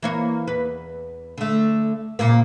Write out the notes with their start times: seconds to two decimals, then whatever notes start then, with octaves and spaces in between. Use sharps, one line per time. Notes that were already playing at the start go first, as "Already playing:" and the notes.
0.03 E3 A#3 C#5
0.47 E2 B4
1.38 D3 A3
2.19 A#2 C#3 A#3